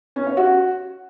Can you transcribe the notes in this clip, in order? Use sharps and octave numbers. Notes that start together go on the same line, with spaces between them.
C#4
C#5
F#4